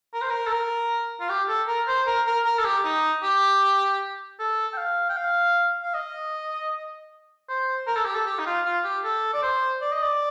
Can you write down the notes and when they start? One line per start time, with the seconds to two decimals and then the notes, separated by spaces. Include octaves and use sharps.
0.14 A#4
0.22 C5
0.30 A#4
0.47 A4
0.52 A#4
1.20 F4
1.29 G4
1.49 A4
1.68 A#4
1.88 C5
2.07 A#4
2.27 A#4
2.46 A#4
2.59 A4
2.65 G4
2.85 D#4
3.23 G4
4.39 A4
4.73 G5
4.78 F5
5.09 G5
5.17 F5
5.83 F5
5.94 D#5
7.49 C5
7.87 A#4
7.97 A4
8.05 G4
8.15 A4
8.27 G4
8.39 D#4
8.46 F4
8.65 F4
8.84 G4
9.04 A4
9.33 D5
9.43 C5
9.81 D5
9.92 D#5
10.03 D5